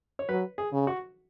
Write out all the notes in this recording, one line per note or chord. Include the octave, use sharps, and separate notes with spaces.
C#5
F#3 B4
G#4
C#3
F#4